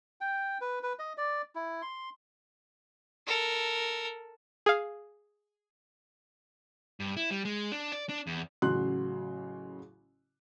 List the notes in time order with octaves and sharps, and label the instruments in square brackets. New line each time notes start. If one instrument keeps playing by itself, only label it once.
[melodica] G5
B4
B4
D#5
D5
E4
C6
[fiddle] A4 A#4
[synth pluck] G#4 F5
[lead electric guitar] G2
E4
G3
G#3
D4
D5
D4
E2
[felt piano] A1 C#3 F#3 F#4 C6 F#6